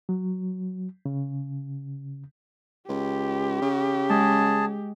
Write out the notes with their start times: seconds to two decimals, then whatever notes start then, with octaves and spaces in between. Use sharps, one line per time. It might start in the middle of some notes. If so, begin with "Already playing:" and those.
0.09 F#3
1.06 C#3
2.89 C#2 G4
3.62 C#3
4.09 G#3 G#4 A5